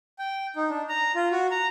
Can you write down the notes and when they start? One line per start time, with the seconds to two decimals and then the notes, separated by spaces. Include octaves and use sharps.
0.19 G5
0.56 D#4
0.70 D4
0.89 A#5
1.15 F4
1.31 F#4
1.51 A#5